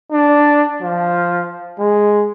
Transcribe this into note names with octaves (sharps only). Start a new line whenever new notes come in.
D4
F3
G#3